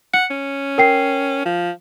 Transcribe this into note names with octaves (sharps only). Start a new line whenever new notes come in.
F#5 C#7
C#4
A#4 G5 C7
F3